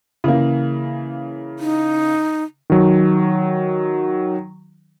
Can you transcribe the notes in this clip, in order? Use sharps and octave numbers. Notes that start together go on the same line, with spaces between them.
C#3 E3 A#3
D#4
D#3 F#3